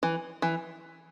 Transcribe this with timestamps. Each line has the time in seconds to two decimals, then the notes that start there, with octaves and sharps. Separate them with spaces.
0.03 E3
0.42 E3